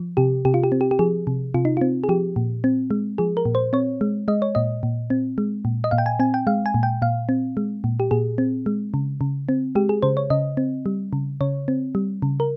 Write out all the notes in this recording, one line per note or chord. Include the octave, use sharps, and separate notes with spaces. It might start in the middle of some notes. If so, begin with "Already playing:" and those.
Already playing: F3
C3 G4
C3 G4
F4
G4
C4
G4
G4
F3 G#4
C3
C3 F4
D#4
C4 F4
G#4
F3 G4
A#2
C4
G#3
F3 G#4
A#4
A#2
C5
C4 C#5
G#3
G#3 D#5
C#5
A#2 D#5
A#2
C4
G#3
A#2
D#5
A#2 F5
G5
G#5
C4 G#5
G5
G#3 F5
G#5
A#2
G5
A#2 F5
C4
G#3
A#2
G4
A#2 G#4
C4
G#3
C#3
C#3
C4
G#3 G4
G#4
C#3 C5
C#5
C#3 D#5
C4
G3
C#3
C#3 C#5
C4
G3
C#3
A#4